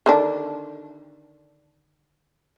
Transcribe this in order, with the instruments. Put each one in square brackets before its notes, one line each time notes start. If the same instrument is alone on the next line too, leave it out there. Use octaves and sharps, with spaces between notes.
[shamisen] D3 D#3 D4